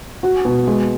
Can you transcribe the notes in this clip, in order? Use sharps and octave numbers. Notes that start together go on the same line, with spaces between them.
F#4
B2
G#3